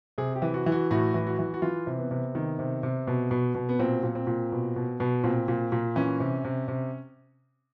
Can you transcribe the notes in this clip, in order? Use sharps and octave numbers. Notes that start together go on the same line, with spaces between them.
C3 G#4
G4
E3
F#4
E3
F#4
A2 F#4
E3
F#4
E3
F#4
E3 F4
C3
B3
C3
D#3
C3
C3
B2
B2
B2
B3
A#2 C4
A#2
C4
A#2
B2
B2
B2
A#2 C4
A#2
A#2
E3 C#4
C3
C3
C3